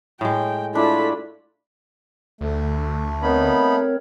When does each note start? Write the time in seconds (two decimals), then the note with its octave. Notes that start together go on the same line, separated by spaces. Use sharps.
0.21 A2 G#3 G5
0.75 A3 D4 E4 F4 A4 B5
2.41 D2 A3
3.23 B3 C4 D#4 A#4 C#5 B5